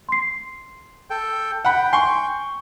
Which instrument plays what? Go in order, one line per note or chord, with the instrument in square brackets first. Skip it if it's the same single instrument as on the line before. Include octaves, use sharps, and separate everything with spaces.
[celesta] C6 C7
[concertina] A4 G5
[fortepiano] F#5 B5 [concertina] G5
[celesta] G#5 [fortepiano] C6 C#6